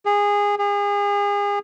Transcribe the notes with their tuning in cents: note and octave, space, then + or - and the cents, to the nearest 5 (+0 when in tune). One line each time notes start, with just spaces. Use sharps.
G#4 -20
G#4 -35